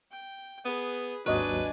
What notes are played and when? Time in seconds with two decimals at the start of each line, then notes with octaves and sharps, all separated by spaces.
0.12 G5
0.65 B3 G#4 B4
1.26 G#1 D#2 F#3 D4 B4 C#5 D#5 G#5